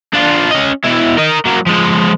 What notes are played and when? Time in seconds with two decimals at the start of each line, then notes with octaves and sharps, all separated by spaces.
0.14 D4 F4
0.51 C#4 D#5
0.84 B2 E4
1.17 A#4 D#5
1.45 F#3 A#3
1.66 F3 G#3